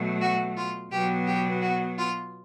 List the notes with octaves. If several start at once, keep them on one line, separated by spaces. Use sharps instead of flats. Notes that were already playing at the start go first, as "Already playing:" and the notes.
Already playing: B2 F#3 A3
F#4
F4
B2 F#3 B3 G4
G4
F#4
F4